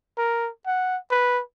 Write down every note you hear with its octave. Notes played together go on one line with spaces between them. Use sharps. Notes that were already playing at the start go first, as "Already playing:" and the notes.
A#4
F#5
B4